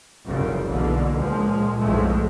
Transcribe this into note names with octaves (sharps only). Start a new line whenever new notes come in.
F1 C2 F#2 C#3
B1 B2 D3 E3 A#3
C#2 A#2 F3 G#3
B1 F2 A2 F3 G#3 A3